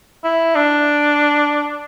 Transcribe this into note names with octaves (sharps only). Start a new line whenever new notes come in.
E4
D4